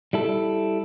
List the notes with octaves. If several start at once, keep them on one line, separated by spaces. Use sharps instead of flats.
G3 E4 A4